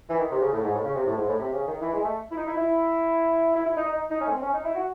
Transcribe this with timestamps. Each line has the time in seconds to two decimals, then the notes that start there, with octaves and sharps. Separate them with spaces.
0.09 E3
0.19 D#3
0.31 C3
0.41 C#3
0.53 A2
0.63 G#2
0.74 A2
0.84 C#3
0.95 C3
1.06 A2
1.16 G#2
1.28 A2
1.39 C3
1.53 C#3
1.68 D#3
1.82 E3
1.93 G#3
2.04 A3
2.31 E4
2.37 D#4
2.47 E4
2.57 E4
3.55 E4
3.66 E4
3.76 D#4
3.88 D#4
4.10 D#4
4.21 C#4
4.26 A3
4.31 C4
4.43 C#4
4.53 D#4
4.64 E4
4.75 F#4